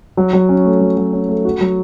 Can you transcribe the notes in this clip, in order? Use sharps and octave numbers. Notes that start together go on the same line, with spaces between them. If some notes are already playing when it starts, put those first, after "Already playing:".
F#3
F#3
C#4
A3
F#3
F#3
C#4
A3
F#4
F#3